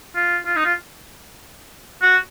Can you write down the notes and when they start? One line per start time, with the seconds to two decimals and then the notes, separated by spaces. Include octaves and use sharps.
0.15 F4
0.46 F4
0.56 D#4
0.65 F4
2.02 F#4